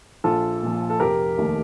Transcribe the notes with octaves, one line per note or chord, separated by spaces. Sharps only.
A#1 F4 A4
A#2 F3
A4
F1 G4 A#4
D#2 D#3 A3